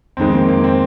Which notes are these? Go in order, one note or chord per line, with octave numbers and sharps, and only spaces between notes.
F2 D#3 G#3 C4
A#3
A#3
C4